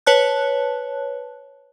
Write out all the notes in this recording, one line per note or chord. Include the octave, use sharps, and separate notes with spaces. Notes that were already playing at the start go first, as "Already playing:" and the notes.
B4 C#5 A5 F#6